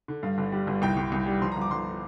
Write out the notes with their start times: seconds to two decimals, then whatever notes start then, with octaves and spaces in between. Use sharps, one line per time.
0.08 D3
0.23 G2 F5
0.38 G1
0.52 G3
0.67 G1
0.82 C2 G5
0.97 C2
1.12 C2
1.26 G3
1.41 F3 C6
1.52 A#5
1.56 G1
1.61 D6
1.71 G1 C6